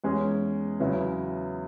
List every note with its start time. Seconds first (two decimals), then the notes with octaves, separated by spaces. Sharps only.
0.04 E2 E3 G#3 C#4 G#4
0.80 E2 C#3 F#3 B3 E4